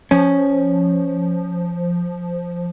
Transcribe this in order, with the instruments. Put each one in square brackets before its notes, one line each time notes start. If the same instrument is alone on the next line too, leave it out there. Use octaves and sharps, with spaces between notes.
[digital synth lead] F3 [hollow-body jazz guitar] C#4